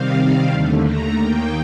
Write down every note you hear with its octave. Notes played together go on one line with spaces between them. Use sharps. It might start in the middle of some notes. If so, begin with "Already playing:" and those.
Already playing: C3 D#3 G3 C4 F5
D#2 D3 A3
A#5
D#2 D#3 A#3 G5